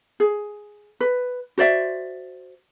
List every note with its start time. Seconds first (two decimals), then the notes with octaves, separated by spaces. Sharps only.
0.20 G#4
1.00 B4
1.58 F#4 C5 D5 E5